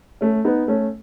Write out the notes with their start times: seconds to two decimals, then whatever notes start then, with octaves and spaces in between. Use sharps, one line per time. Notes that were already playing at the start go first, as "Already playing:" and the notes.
0.21 A3 C#4
0.45 B3 D#4
0.68 A3 C#4